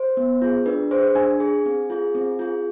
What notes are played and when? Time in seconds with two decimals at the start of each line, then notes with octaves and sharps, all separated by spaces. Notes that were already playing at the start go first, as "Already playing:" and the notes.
Already playing: C5
0.17 B3
0.42 F4 G#4
0.66 D4 B4
0.91 G#4 C5
1.15 D4 G#5
1.40 G#4
1.66 C4
1.90 F4 G#4
2.15 C4
2.39 F4 G#4